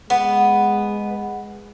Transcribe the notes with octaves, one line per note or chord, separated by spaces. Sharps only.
G#3 B3